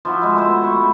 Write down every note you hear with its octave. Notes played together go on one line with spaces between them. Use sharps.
F3 E4 F#4
G#3 E4
A3 E4 C5
B3
B5 C#6
A3